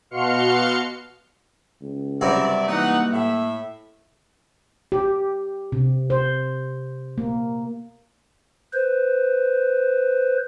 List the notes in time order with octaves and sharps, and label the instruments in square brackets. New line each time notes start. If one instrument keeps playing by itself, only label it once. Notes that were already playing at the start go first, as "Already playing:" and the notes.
[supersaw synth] B2 F#4 F5 C6 F6 C#7
[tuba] C#2
[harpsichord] G2 C3 F#3 [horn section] D5 E5
[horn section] E3 D#4 F#5 [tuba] A#3
[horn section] A2 E5
[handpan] G4
C3
C5
A#3
[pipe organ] B4 C5